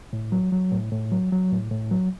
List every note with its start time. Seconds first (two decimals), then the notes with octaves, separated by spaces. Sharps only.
0.13 A2
0.32 F#3
0.52 F#3
0.72 A2
0.92 A2
1.12 F#3
1.32 F#3
1.52 A2
1.71 A2
1.91 F#3